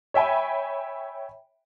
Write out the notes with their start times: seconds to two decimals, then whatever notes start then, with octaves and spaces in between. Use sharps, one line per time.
0.14 C#5 E5 G5 G#5 B5